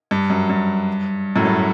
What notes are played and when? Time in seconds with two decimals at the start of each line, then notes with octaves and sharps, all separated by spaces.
0.11 G2
0.30 F#2
0.49 G2
1.36 F#2 A2
1.45 G2